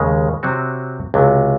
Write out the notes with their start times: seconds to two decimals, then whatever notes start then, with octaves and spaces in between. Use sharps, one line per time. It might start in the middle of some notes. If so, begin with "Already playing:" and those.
Already playing: D#2 C#3 G#3
0.43 C3 F#3 C4 F#4
1.14 C#2 C3 F#3